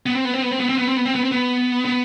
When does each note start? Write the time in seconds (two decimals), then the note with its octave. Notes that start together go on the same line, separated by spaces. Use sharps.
0.06 B3
0.15 C4
0.25 B3
0.34 C4
0.42 B3
0.51 C4
0.60 B3
0.69 C4
0.78 B3
0.88 C4
0.97 B3
1.05 C4
1.15 B3
1.23 C4
1.32 B3
1.85 B3